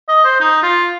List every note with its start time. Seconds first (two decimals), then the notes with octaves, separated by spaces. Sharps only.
0.08 D#5
0.24 C5
0.40 D#4
0.63 F4